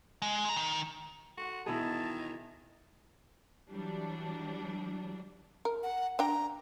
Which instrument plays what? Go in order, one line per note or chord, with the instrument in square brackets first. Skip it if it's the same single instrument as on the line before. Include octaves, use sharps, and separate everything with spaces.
[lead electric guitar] G#3
G#3 A#5
D#3
[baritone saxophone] F#4 [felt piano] A4 F#5
[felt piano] E2 B2 [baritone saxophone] D#3 [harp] E4 G#4 [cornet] A5
[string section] E3 F#3 G3 D4
[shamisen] A#4
[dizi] F#5
[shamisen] D4 G5 [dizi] A#5